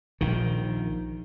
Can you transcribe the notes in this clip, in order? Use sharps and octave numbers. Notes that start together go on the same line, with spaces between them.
A#1 D#3